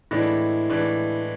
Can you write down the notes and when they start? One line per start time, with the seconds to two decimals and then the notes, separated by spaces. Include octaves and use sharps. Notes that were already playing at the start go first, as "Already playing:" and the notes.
0.11 A2 E3 G#3 D4 E4
0.69 A2 E3 G#3 D4